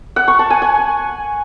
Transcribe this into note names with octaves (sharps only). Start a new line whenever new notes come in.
F#5
C#6
A5
G#5
G#5